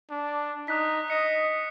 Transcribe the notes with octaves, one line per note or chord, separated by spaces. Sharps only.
D4
D#4 D#6 F#6 B6
D#5 C#7